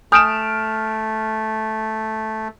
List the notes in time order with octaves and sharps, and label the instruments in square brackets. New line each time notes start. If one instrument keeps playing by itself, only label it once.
[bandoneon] A3 [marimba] G#5 D#6 G6 [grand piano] F6 D7 E7